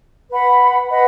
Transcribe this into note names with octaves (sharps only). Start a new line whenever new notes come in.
B4 F#5 B5
B4 D#5 F#5 B5